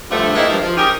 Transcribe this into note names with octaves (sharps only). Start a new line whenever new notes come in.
G2 D3 F3 A3
G#3 A#3 C4 D#4 E4
G2 F3
F3
C#4 D#4 G4 G#4 A#4